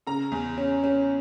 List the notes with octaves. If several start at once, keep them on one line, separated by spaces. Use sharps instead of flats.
C#3 A#5
E2
C#4
C#4